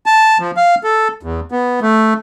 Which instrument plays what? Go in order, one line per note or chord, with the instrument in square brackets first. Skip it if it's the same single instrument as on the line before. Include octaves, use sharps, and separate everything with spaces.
[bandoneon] A5
F3
F5
A4
E2
B3
A3